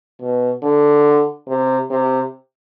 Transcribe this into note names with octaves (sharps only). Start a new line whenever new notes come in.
B2
D3
C3
C3